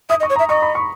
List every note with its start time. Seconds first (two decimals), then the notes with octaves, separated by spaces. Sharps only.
0.09 E5 D#6
0.20 D#5
0.23 C#6
0.30 C#5
0.36 A#5
0.39 E5
0.49 D#5 C#6
0.62 B5
0.75 C#6